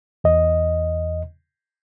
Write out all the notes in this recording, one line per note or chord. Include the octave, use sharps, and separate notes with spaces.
E2 D#5